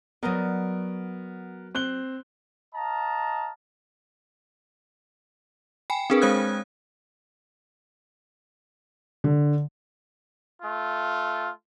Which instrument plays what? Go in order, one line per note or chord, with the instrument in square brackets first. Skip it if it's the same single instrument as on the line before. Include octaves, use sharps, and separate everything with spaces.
[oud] F#3 D5 D#5 [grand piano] B3 A#4
[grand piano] C4 F#6 G7
[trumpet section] D#5 F5 A5 A#5
[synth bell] G5 G#5 B5
C4 D4 G#4 A#4 B4
G#3 C5 F5 D#6 F#6 G#6
[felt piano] D3
[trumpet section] A3 F4